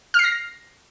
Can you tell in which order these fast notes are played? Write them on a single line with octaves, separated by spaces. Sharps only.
F6 C7 A#6